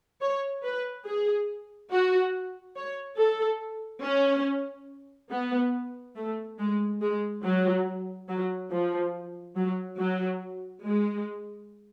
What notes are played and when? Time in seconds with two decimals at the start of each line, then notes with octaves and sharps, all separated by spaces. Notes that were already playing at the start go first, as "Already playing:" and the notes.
0.21 C#5
0.64 B4
1.06 G#4
1.91 F#4
2.76 C#5
3.19 A4
4.03 C#4
5.32 B3
6.16 A3
6.59 G#3
7.01 G#3
7.44 F#3
8.29 F#3
8.72 F3
9.56 F#3
9.99 F#3
10.84 G#3